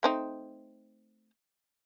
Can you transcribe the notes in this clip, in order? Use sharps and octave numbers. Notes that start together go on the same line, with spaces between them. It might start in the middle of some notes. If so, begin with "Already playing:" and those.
A3 C4 D#4